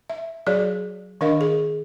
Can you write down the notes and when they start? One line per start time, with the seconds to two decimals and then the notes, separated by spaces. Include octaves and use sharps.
0.10 E5
0.47 F#3 F#4 G#4 C#5 D5
1.21 D#3 D4 A#4 D#5 F5
1.41 G#4